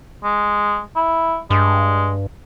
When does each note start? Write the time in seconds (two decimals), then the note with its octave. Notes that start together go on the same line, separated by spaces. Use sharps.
0.24 G#3
0.96 E4
1.50 G2 G#3